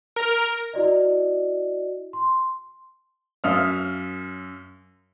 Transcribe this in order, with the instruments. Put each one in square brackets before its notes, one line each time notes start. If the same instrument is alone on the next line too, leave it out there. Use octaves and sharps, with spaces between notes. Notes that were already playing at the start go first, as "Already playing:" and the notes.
[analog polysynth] A#4
[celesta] E4 F#4 D5 D#5
C6
[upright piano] F#2 E5 F5 D#6 F6